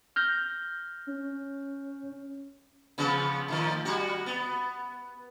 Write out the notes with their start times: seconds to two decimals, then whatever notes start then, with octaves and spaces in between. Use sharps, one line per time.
0.16 F6 G6 A#6
1.07 C#4
2.98 C#3 F3 B3
3.48 A2 D#3 F3
3.85 G3 F#4
4.26 B3